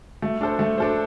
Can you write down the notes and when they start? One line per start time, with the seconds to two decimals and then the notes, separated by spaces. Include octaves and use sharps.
0.22 A3
0.41 D4 A4 C5
0.59 A3
0.78 D4 A4 C5